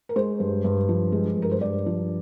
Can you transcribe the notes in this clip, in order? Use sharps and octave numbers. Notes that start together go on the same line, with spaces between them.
A#4
G#3 C5
G2
G2
F3
G#3
G2
A#4
C5
G2 D5
F3